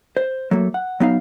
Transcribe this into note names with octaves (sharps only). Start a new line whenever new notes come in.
C5
F#3 A3 A#3
F#5
F#3 B3 D#4 F5